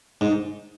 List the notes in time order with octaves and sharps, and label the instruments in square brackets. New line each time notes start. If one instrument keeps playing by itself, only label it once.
[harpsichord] G#2